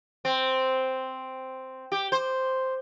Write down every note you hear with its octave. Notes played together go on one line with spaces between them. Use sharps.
C4
G4
C5